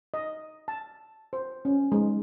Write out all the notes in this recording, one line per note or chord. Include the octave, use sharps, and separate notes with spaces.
D#5
A5
C5
C#4
G#3